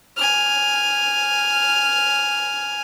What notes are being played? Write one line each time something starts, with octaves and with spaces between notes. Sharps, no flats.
G#5 F6